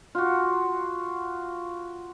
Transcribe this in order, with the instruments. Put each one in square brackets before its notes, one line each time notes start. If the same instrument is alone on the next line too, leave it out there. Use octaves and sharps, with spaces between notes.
[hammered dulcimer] F4 F#4